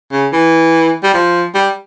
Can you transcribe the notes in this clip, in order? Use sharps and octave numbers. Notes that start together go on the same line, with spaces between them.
C#3
E3
G3
F3
G3